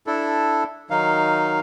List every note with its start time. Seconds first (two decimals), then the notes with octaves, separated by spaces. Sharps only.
0.07 D4 E4 A4
0.90 D#3 F#3 D#4 F5